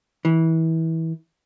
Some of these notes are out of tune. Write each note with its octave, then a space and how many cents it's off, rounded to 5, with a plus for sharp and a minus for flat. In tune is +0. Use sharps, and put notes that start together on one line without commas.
E3 -25